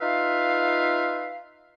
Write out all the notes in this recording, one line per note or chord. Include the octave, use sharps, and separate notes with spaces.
D#4 F4 B4 E5 F5